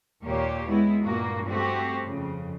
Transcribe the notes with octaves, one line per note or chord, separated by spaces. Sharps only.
D#2 A#2 A#3 G4 C#5
G#3 B3 E4
G2 A#2 A#3 F#4
A3 C4 F#4 G4
F2 C#3